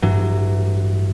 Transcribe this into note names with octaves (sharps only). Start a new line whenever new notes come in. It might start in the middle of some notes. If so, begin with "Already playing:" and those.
A1 G2 E3 F#3